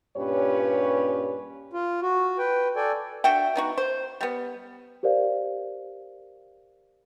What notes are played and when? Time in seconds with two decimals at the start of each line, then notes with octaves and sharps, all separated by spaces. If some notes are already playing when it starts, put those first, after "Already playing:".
0.17 G2 A#2 C#4 G4 B4 C#5
1.73 F4
2.02 F#4
2.38 B4 G5
2.76 A4 D5 G5 G#5
3.24 D4 F#4 E5 G5
3.55 B3 D#4 F#4
3.78 C5
4.21 G3 B3
5.03 G4 A#4 C5 D5 F5